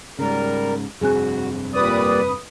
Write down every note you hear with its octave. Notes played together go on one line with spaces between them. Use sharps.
G#2 C#3 G3 A#4
F1 G2 C4 F#4 G#4 G#5 F#6
A#2 G3 B4 D5 D#6